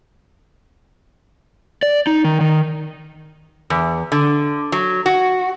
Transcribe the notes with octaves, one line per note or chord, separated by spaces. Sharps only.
D5
D#4
D#3
D#3
E2
D3
F#3
F#4